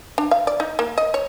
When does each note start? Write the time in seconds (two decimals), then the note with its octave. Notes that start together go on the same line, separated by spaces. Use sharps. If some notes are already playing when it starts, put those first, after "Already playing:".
0.18 D4
0.31 F5
0.47 D5
0.60 D#4
0.79 A#3
0.98 D#5
1.14 C#5